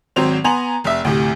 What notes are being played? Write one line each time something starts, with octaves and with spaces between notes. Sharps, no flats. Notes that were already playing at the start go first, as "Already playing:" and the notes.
G#1 F#3 C4 C5 F7
B3 G#5 A#5 C6 F7 F#7
F1 E5
D2 A2 C3